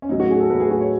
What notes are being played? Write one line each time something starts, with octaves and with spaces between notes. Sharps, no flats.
C#4
A2 F#3 D#4
F#4
G#4
A4
A2 F#3 B4
G#4
F#4
C#5